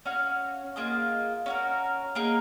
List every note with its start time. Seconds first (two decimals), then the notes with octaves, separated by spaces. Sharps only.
0.05 C#4 F#4 C#5 F5
0.76 A#3 F4 G#4 D#5
1.46 C#4 F#4 A#4
2.15 A#3 D#4 G#4